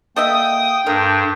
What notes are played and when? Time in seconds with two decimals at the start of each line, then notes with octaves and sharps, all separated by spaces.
0.16 A#3 A4 D#5 E5 G5 D#6
0.87 G2 A4 A#4